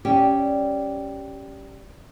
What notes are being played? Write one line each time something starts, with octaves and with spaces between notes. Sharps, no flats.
G3 C#4 G4